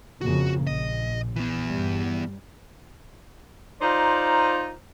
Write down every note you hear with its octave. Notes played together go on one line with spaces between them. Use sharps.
F2 C#3 A#3 F#4
A#1 D#5
E3 B3
G2 G3
D#4 F4 A#4 C5 D5